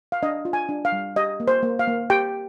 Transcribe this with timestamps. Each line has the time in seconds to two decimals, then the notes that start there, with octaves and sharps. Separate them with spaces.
0.12 F5
0.23 D4 D#5
0.45 F4
0.53 G#5
0.69 D4
0.85 F5
0.92 G3
1.16 G4 D#5
1.40 A#3
1.48 C5
1.63 A#3
1.79 F5
1.87 A#3
2.10 G4 G5